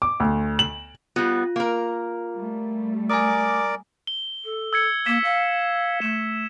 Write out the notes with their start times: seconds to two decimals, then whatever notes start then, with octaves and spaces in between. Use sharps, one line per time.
0.02 D6
0.20 D2
0.59 F#7
1.16 G3 B3 F4
1.56 A#3 A#4
2.34 G3 A3
3.10 A#4 D5 G#5 A#5 D6 D#6
4.07 G7
4.45 A4
4.73 E6 G#6 C#7
5.06 A#3 B6 E7
5.24 F5
6.02 A3 E7